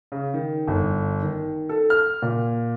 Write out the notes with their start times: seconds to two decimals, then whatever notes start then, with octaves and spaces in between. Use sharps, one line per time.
0.12 C#3
0.34 D#3
0.68 G1
1.22 D#3
1.69 A4
1.90 F6
2.22 A#2